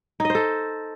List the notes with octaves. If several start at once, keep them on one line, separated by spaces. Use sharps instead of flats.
D#4 A4 C5 D#5